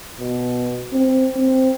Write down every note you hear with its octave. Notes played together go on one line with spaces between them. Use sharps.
B2
C4
C4